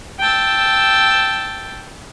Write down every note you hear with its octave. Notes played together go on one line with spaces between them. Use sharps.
G5 A5 E6